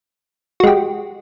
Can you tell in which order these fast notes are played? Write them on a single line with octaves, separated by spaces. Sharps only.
F#4 G#3 G4